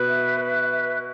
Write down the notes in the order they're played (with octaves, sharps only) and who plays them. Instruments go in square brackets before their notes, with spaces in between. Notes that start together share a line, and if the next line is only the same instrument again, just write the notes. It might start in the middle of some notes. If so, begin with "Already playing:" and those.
Already playing: [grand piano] B2 [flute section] B4
[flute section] E5
B4
E5